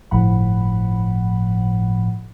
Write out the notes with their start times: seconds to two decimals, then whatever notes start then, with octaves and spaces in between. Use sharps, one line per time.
0.11 G1 A2 F3 F#5 B5